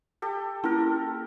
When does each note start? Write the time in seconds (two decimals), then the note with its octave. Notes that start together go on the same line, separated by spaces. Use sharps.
0.22 G4 A4
0.64 A#3 C#4 E4 A4 A#4